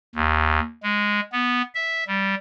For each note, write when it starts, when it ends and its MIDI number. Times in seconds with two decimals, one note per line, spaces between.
0.15 0.60 39
0.83 1.20 56
1.32 1.62 59
1.75 2.04 76
2.07 2.35 55